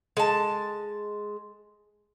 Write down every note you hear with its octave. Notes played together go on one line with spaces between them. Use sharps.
G#3 A5